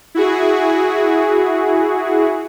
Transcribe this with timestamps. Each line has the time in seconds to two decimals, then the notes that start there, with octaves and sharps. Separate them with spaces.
0.15 E4 F#4 G#4